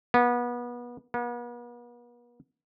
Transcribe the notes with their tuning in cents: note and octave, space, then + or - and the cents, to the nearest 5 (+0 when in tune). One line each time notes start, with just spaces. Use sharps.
B3 -30
B3 -45